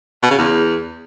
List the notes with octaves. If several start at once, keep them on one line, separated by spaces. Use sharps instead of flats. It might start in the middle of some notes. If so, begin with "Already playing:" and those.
B2
C#3
E2